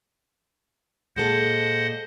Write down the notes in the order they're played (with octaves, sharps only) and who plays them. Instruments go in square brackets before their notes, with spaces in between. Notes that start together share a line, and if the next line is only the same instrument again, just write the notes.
[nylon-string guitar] A#2 G#3 A4 [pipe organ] C5 D#5 F#5